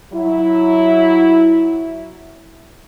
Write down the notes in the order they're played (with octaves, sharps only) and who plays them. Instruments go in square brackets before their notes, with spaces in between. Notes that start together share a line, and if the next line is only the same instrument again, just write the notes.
[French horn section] F#3 E4